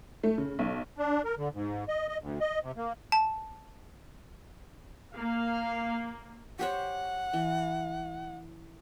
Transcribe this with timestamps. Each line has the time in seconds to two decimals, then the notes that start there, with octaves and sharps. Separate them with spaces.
0.24 A3
0.38 C#3
0.59 B1
0.98 D4
1.25 A#4
1.37 D3
1.54 G#2
1.88 D#5
2.08 D#5
2.20 D2
2.41 D#5
2.63 C3
2.77 A#3
3.12 A5
5.14 A#3 F5
6.59 G4 C5 C#5 F#5
7.34 E3